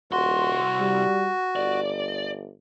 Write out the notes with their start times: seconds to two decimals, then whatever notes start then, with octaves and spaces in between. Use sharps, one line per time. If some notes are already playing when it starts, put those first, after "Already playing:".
0.12 D#1 C2 F#4 C6
0.80 G3
1.56 G1 D5